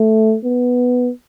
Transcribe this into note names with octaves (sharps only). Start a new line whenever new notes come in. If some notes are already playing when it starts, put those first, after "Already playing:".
Already playing: A3
B3